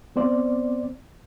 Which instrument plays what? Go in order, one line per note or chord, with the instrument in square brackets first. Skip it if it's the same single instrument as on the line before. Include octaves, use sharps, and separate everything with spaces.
[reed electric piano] B3 C4 C5 D5